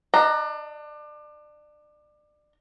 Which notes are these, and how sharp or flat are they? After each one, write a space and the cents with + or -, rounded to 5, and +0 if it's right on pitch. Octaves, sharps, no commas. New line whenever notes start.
D4 +30 D#5 -5 A#5 +0